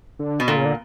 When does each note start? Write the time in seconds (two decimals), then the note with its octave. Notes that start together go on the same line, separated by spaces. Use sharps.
0.19 D3
0.40 B2
0.48 A#2 D3
0.57 C#3
0.65 D3